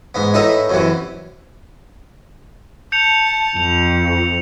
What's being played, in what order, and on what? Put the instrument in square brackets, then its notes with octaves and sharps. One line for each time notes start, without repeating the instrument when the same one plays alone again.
[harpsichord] G#2 B3
A2 D#4 B4 E5 A#5
F#2 C3 E3
[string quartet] A5 [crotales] G6 C#7 F7
[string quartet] F2 [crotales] F7